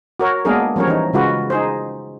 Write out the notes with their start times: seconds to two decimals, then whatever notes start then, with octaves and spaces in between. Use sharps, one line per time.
0.20 F#4 A#4 C#5
0.45 G#3 A#3 B3 D4 G#4 A#4
0.76 F3 G3 C#4 A#4 C#5
0.87 E3 D#4
1.13 C#3 G#3 F4 F#4 B4
1.50 D#4 G#4 C5